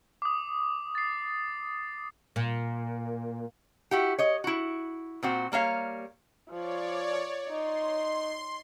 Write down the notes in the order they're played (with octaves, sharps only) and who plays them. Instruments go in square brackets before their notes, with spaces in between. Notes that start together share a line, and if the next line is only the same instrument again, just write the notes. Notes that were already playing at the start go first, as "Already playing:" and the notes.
[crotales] D6 D#6
A6 C7
[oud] A#2
[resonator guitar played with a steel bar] E4 F#4 G4
C#5 D#5
E4 F#4
A#2 C4 F#4
G3 A#3 C#5 F5
[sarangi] F3 [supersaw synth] C#5 D5
[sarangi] D#4 [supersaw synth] C6